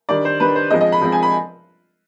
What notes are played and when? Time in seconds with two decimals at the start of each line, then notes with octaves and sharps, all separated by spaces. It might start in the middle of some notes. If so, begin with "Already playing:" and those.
0.09 D#3 G3 D4 D5
0.25 C5
0.40 D#3 G3 D4 B4
0.56 C5
0.70 F3 G#3 C4 D#5
0.81 D#5
0.92 B5
1.01 F3 G#3 C4
1.12 G#5
1.23 B5